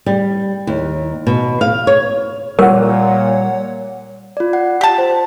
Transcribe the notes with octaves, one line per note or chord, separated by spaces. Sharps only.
G3
D#2
B2
F5
C#5
A#2 G3 A#4 C#5 F#5
F4 D5
F#5
G4 A5
C5